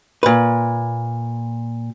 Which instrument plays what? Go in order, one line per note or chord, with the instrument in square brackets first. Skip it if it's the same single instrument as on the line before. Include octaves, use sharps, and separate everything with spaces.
[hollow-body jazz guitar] A#2 B4